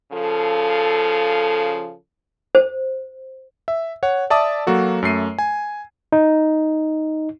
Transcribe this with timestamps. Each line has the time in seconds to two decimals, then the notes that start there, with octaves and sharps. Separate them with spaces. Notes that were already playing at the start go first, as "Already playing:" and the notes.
0.12 C#3 F3 A4
2.55 C5
3.68 E5
4.03 C#5 F#5
4.30 D5 E5 A5 D6 D#6
4.67 F#3 A#3 F#4 A4
5.02 F#2 A3 C7 D#7
5.39 G#5
6.12 D#4